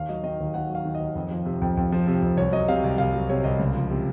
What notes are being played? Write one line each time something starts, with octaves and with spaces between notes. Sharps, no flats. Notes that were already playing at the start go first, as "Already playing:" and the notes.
Already playing: D#2 F5
F#3 D#5
D#3 D#5
D#2
D#2 F#5
F#3
F5
D#3
D#5
D#2
F2
F3
C3
F2
F2
F3
C3
F2
C2 C#5
F#3 D#5
C3 F5
C2
C2 F5
F#3
C3 C#5
C2 D#5
C#2
F3
C3